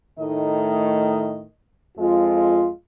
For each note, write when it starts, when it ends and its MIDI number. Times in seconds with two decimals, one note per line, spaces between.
0.19 1.44 45
0.19 1.44 51
0.19 1.44 57
0.19 1.44 63
0.19 1.44 75
1.98 2.69 41
1.98 2.69 56
1.98 2.69 65